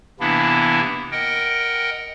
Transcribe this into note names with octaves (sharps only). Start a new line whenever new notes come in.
C3 E3 A#3 B3 D4 E4
A#4 D#5 F#5 G5